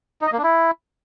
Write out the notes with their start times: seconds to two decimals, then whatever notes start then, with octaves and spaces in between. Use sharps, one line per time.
0.21 D#4
0.27 D#5
0.32 A#3
0.38 D4
0.43 E4